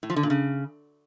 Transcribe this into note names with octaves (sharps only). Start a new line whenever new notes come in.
A2
F3
D3
A#2
C#3